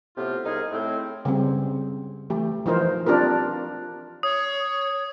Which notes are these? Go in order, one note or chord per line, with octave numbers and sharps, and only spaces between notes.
A2 C3 B3 F4
C2 D#4 G#4 F5
A2 C4
C#3 G3 C4
E3 A3 G4
E3 F3 D#4 A#4 C5
C4 D4 F4 G4 A#4
C#5 D#6